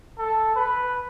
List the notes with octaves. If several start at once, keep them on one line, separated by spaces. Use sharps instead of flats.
A4
B4